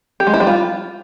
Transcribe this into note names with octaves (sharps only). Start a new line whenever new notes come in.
G4
G#3
E4
G3
F4